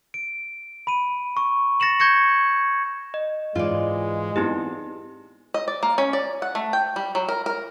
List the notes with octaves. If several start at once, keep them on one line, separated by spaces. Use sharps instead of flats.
D7
B5 D#7
C#6
A6 A#6 C#7 E7 F#7
C#6 G6 G#6 A#6 C#7
D#5
G#2 E3 G#3 F4 D5
B3 C4 D#4 E4 G4
D#5
D5
A#3
C#4
D5
F#5
A3
G5
G3
F#3
A#4
A#4